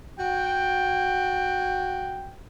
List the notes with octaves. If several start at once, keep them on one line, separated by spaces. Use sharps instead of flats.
F#4 G5